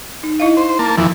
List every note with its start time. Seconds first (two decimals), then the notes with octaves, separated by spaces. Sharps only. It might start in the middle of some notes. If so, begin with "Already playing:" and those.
0.23 D#4
0.40 E4 D#5 F5
0.57 C5
0.79 A#3 A5
0.98 F2 E3